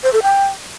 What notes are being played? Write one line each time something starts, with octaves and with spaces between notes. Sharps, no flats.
C5
A4
G5